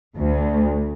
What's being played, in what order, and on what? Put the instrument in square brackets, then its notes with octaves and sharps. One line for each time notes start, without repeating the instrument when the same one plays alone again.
[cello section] D2